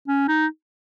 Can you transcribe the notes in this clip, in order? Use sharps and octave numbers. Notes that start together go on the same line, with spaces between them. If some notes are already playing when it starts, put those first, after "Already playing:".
C#4
D#4